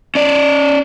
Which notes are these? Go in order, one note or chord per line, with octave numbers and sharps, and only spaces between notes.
C#4 D5